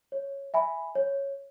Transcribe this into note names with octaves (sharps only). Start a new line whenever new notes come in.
C#5
E5 G#5 B5
C#5